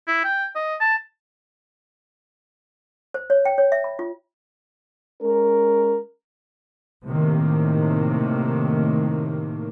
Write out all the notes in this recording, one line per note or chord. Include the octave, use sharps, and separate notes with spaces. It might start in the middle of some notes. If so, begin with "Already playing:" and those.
E4
G5
D#5
A5
C5
C#5
G5
C#5
E5
B5
F4
G#3 C#4 A#4
A2 C3 D#3 A#3